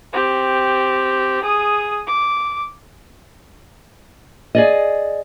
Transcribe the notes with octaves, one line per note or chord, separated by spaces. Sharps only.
C4 G4
G#4 D#6
D6
G#4 D5 D#5